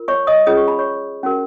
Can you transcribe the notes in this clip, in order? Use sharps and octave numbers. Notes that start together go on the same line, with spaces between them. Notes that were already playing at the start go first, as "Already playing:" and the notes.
Already playing: F4 A#4
C#5 C#6
D#5 D#6
C#4 F4 G#4 C#5 D#6
C#6
B5
C#5 C#6
C#4 F#4 A#4